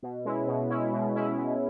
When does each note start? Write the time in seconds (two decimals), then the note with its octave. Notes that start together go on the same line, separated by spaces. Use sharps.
0.02 B2
0.25 G#3 C#4 E4
0.48 B2
0.70 G#3 C#4 E4
0.93 B2
1.15 G#3 C#4 E4
1.37 B2